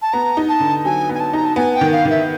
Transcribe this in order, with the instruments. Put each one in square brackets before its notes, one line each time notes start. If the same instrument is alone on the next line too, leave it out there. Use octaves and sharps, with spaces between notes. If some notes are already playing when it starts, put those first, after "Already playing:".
[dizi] A5
[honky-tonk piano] B3 [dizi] A#5
[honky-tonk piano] D#4
[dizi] A5
[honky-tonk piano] D3
[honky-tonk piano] F#3 [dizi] G#5
[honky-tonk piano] B3 [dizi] G#5
[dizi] A5
[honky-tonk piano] D#4 [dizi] A#5
[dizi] A5
[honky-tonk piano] B3 [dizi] G#5
[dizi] G5
[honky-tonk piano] D#3
[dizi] F5
[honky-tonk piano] D#3
[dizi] E5